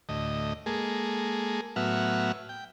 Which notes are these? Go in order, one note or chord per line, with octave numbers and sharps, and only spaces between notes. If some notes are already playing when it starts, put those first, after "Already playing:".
D2 A2 D#5
G#3 A#3 G#4 A4
A2 F#3 B3 E5 F#5 F6
G5